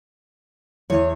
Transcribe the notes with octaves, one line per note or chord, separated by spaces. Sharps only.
E2 C#5 D#7